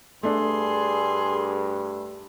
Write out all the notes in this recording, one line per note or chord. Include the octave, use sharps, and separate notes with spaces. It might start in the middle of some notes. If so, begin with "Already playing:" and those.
G2 A3 D4 G#4 C6